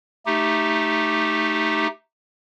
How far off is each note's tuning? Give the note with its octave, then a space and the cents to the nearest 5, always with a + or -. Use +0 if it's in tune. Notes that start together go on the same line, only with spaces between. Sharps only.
A3 +0 D#4 +0 G4 +0